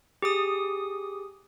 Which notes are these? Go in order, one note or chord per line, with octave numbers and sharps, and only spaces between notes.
G4 G#4 D#6